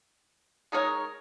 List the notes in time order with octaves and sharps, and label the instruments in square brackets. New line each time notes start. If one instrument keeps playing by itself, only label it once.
[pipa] G#3 D#4 A#4 C#5